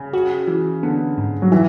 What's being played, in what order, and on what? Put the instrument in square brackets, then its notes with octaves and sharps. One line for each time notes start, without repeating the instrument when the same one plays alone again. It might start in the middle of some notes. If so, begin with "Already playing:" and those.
Already playing: [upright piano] C#3
[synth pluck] F#4
E3
[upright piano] D3 [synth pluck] B3
[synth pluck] G#2
[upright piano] F#3
[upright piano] E3 [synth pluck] E5